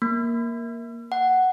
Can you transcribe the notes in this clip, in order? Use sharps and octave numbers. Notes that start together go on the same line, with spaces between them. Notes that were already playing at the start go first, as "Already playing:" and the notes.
A#3
F#5